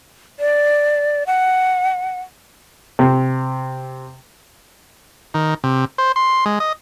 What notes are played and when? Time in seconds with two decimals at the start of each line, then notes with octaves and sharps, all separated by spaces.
0.40 D5
1.27 F#5
2.99 C3
5.34 D#3
5.64 C3
5.98 C5
6.16 C6
6.46 G#3
6.60 D#5